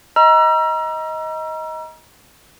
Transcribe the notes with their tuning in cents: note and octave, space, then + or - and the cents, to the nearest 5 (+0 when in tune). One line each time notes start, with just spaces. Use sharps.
D#5 +20 A#5 +30 E6 +40